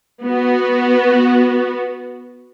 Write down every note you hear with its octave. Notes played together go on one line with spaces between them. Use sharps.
B3 F#4